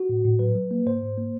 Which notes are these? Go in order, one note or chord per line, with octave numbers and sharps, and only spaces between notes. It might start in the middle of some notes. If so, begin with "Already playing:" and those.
Already playing: F#4
A2
A2
F#3 B4
F#3
A#3
G#2 C5
G#2
A#3